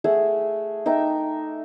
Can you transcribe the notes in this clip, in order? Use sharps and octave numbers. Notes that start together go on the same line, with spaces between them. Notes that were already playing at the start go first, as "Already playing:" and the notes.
A3 G#4 E5 F#5
D#4 E5 G5 D6